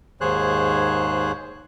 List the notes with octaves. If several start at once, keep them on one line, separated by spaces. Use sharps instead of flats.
D#2 G#2 G#4 C5 C#5 F#6